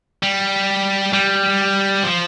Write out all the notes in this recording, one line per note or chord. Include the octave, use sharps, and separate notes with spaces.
G3
G3
F3